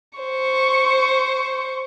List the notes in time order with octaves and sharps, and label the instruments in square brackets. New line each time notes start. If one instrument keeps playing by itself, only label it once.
[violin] C5 C#6